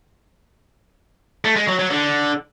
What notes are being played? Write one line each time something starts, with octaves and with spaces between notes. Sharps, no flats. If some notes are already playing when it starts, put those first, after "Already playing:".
A3
G#3
F#3
F#3
D3